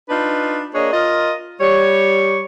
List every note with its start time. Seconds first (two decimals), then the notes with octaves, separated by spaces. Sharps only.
0.09 D4 D#4 F4 B4
0.74 A#3 D4 G#4 C#5 D#5
0.93 F4 A#4 D#5
1.60 G3 C#5